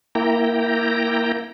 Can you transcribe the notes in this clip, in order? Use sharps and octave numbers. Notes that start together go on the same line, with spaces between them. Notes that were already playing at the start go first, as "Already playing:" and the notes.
A#3 E4 G5 A#5